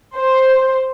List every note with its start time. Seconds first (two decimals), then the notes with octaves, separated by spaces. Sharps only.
0.15 C5